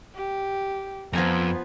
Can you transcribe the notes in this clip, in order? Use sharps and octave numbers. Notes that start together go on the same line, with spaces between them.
G4
F2 F3 B3 G#5 A#5